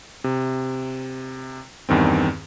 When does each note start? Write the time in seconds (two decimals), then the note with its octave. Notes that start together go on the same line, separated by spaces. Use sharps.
0.24 C3
1.89 E2 G2 D#3 C4